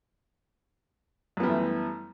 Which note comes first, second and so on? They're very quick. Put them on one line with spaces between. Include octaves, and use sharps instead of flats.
F#2 B3 G3 E3 A3